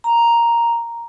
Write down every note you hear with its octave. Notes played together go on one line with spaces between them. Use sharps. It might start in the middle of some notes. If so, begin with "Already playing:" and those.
A#5